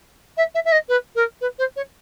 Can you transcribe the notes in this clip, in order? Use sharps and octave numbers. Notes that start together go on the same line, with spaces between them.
E5
E5
E5
D#5
B4
A#4
B4
C5
C#5